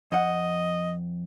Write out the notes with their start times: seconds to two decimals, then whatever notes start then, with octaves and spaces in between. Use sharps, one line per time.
0.12 F2 D#5 F#5